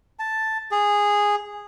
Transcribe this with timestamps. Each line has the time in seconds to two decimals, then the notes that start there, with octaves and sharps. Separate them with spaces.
0.19 A5
0.71 G#4